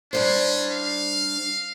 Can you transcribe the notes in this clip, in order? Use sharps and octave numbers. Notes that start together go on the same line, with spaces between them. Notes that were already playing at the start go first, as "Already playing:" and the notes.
G3 C#4 D4 C5
F5